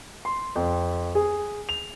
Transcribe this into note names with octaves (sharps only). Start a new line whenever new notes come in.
C6
F2
G#4
F7